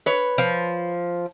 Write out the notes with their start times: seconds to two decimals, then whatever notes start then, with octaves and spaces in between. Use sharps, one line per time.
0.06 B4 C#5
0.38 F3